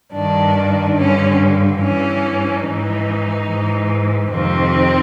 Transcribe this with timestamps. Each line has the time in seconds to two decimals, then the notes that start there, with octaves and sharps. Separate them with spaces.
0.13 G2 D#3 D4
0.96 G2 C#4
1.02 D3
1.80 G2 E3 C#4
2.64 G#2 E3 D#4
3.48 G#2 E3
4.31 F2 C3 D#3 C4